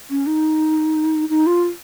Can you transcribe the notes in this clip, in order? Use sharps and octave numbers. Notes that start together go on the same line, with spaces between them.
C#4
D#4
D#4
F4